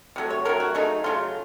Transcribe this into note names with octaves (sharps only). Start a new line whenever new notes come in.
C3 F#3 A3
C#5
C3 F#3 A3 A#4
F#4
C#3 F#3 A3 D#4
C#3 F#3 A3 F4